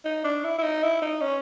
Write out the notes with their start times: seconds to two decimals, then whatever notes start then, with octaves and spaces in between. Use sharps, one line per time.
0.05 D#4
0.24 D4
0.44 E4
0.58 E4
0.63 D#4
0.83 E4
1.02 D#4
1.21 C#4